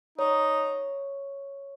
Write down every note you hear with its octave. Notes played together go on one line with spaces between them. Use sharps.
D#4 C#5